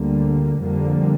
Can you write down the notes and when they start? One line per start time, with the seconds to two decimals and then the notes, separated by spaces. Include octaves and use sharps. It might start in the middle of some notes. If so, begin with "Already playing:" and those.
Already playing: D2 D3 G3 A#3
0.61 F2 D3 G3 A#3